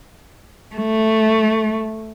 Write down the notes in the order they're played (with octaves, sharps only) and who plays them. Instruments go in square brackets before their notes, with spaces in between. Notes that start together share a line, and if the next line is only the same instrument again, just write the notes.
[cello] A3